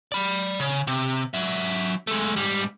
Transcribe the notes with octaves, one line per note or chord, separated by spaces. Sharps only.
D5 B5
C#3
C3
F#3 E5
G#3 A3
G#2 G3